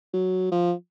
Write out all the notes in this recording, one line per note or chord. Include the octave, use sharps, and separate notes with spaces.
F#3
F3